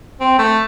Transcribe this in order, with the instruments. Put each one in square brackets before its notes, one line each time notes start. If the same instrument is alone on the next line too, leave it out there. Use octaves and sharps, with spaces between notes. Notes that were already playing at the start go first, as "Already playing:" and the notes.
[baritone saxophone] C4
A3